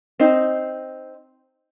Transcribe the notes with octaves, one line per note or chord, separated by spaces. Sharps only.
C4 D#4